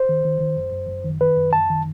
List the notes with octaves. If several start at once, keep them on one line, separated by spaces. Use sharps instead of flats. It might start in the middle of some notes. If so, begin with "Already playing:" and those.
Already playing: C5
D#3
D#3
D#3
F#2
F#2
F#2
D#3
D#3 B4
F#2
F#2 A5
D#3